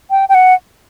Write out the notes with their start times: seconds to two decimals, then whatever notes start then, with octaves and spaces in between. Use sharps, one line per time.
0.11 G5
0.29 G5
0.35 F#5